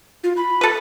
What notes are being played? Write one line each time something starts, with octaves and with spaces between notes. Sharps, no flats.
F4
B5
A4 B4